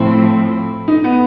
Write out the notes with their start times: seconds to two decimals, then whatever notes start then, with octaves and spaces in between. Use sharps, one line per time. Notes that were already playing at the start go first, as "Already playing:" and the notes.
Already playing: A2 F3 A3 C4 E4
0.88 D#4
1.04 B3